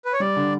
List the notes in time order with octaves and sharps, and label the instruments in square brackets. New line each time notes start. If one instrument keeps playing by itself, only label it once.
[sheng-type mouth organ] B4
C#5
[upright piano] G3 [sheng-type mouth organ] D5
[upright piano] D3